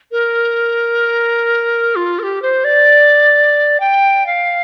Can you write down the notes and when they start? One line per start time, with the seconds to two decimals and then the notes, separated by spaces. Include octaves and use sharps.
0.12 A#4
1.96 F4
2.19 A#4
2.23 G4
2.42 C5
2.64 D5
3.80 G5
4.27 F5